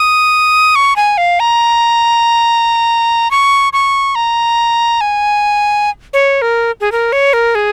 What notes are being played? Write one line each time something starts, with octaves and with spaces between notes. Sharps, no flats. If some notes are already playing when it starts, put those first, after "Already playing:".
Already playing: D#6
C#6
G#5
F5
A#5
C#6
C#6
A#5
G#5
C#5
A#4
G#4
A#4
C#5
A#4
G#4